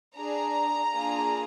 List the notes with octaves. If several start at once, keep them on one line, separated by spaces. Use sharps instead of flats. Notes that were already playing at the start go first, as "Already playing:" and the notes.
D4 G#4 A#5
A#3 D4 F4 G#4